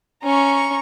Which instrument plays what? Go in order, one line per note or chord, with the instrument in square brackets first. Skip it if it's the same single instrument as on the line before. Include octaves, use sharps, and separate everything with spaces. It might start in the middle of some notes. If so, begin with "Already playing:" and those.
[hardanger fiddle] C#4 [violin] A#5 C#6